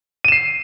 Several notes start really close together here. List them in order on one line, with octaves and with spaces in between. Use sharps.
D#7 E7 C7